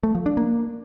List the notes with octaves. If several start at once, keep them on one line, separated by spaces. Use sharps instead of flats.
A3
F3
D4
A#3